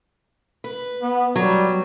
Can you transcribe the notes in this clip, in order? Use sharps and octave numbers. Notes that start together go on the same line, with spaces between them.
B4
B3
F#3 G3